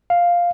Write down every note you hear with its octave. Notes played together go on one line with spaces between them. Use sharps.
F5